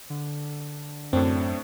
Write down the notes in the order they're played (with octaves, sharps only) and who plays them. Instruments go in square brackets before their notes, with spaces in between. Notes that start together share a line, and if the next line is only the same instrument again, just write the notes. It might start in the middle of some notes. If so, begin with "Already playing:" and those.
[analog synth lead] D3
[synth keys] F#2 [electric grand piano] A2 A3 D4 [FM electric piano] C4